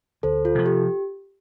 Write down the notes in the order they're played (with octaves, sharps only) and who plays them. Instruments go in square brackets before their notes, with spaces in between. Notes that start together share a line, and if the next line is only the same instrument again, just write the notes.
[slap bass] D2 [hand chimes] A4 C5
[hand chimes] F4 A4
[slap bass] C3 F3
[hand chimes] G4